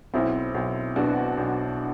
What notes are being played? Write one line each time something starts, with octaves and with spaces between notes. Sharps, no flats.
B1 C4 E4
B1
B2 D4 F#4
B1